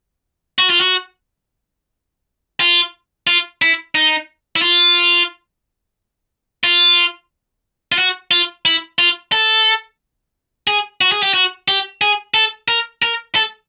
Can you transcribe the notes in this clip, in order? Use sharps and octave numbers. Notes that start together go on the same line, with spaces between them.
F#4
F4
F#4
F4
F4
E4
D#4
E4
F4
F4
F4
F#4
F4
E4
F4
A4
G#4
F#4
G#4
G4
F#4
G4
G#4
A4
A#4
A#4
A4